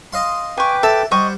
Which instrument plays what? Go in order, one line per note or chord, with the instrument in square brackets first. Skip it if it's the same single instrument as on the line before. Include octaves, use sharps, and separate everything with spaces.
[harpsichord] D#5 F5 C6
[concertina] B4 G5 D6 [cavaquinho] G#5 C#6
[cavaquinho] A4 [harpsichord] E5
[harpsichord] G3 [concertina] C5 F#5 [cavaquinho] D#5 C#6